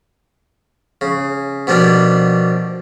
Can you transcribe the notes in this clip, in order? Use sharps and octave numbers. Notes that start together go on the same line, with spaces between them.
C#3
B2 F3 G3 A#3 D4